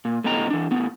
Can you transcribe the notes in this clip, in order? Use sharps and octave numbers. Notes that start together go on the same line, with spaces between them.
A#2
A2 D3 B3 D#5 G5 A#5
E3 D4
A2 B3